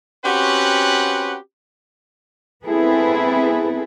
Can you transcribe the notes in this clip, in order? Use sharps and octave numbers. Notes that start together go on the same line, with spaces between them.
C4 C#4 F#4 G4 B4 F#5
B3 C4 E4 G#4 A4 B4